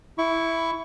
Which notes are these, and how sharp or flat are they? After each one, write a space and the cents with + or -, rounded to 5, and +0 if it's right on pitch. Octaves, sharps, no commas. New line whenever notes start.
E4 +0 C#6 +15